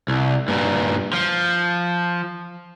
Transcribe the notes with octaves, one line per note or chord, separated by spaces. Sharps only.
C2
G2 A#2
F3